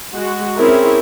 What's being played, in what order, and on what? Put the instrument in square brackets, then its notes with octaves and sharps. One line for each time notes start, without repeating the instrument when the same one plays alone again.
[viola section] G#3 F#4
C4 C#4 E4 G#4 A#4